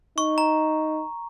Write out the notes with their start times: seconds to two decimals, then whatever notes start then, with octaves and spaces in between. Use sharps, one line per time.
0.17 D#4 C#6
0.38 A#5